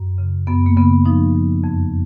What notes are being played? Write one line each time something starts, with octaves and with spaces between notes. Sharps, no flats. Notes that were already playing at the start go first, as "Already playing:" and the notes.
Already playing: F#2
C#3
F#2 B3
A#3
C#3 B3
F3 D#4
F3
F2